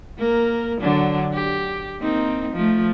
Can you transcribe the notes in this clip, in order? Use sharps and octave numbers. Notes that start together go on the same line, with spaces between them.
A#3 A#4
D3 F#3 D4
G4
A#3 C4 D#4
F3 A3